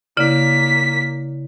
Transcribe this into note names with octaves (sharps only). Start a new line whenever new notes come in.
C#3 A#3 E4 D5 B6